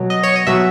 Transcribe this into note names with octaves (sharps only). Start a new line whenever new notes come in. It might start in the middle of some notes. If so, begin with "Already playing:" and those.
Already playing: B2 F#3
D#5
C#5
D#5
B2 F#3 E5